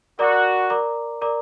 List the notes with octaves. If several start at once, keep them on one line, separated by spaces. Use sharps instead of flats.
F#4 A#4 D5 A#5 D6
A#4 D5 A#5 D6
A#4 D5 A#5 D6